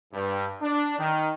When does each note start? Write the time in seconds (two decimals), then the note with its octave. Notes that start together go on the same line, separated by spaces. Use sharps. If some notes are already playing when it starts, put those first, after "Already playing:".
0.13 G2
0.62 D4
0.99 D#3